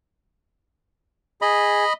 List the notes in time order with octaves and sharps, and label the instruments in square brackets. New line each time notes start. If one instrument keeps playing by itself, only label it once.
[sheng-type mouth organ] G#4 [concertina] D#5 B5